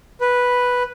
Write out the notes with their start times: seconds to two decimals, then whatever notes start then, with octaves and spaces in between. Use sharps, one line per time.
0.21 B4